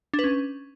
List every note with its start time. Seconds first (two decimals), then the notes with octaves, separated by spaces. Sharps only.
0.14 D4
0.19 B4
0.24 C#4